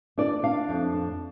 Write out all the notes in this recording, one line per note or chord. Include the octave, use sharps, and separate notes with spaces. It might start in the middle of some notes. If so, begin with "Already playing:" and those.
D4 D5
D4 F5
F2
D4